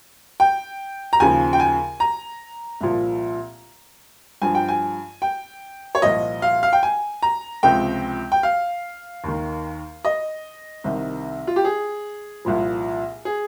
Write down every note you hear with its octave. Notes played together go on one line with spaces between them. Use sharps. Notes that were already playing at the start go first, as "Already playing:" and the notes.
G5
A#5
D#2 C#3 F3 G#5
G5
G#5
A#5
C2 A#2 F3
G2 F3 G#5
G5
G#5
G5
C#5
C2 A#2 F3 D#5
F5
F5
G5
G#5
A#5
C#2 C3 F3 G5
G5
F5
D#2 D#3
D#5
C2 C3 D#3
F4
G4
G#4
C2 A#2 F3
G#4